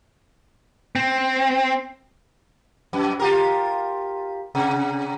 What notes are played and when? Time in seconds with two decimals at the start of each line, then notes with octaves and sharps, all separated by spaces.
0.96 C4
2.93 F#2
3.19 F4 G4 A#4
4.55 C3